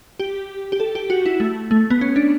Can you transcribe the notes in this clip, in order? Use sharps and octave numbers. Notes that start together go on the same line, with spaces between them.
G4
G4
A4
G4
F#4
E4
A3
A3
B3
C#4
D4